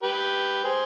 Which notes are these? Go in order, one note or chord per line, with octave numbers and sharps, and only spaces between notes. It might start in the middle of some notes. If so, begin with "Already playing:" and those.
G4 B4
G#4 C5